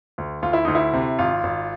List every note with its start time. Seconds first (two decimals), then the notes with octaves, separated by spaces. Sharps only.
0.18 D2
0.42 D2 F4
0.53 E4
0.65 D2 D#4
0.75 E4
0.93 C3
1.19 G#1 F4
1.43 G#1